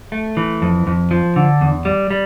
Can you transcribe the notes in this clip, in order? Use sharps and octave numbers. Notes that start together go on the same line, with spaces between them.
A3
E3
F2
F2
F3
D3
E2
G3
G3